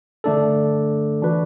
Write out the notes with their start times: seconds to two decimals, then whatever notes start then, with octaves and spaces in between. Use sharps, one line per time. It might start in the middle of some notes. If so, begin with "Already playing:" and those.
0.24 D3 A3 D4 A4
1.22 E3 D4 F#4 B4